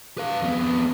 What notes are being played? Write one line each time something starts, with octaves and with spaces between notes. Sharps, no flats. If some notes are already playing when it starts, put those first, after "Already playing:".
B4 F5
F2 B3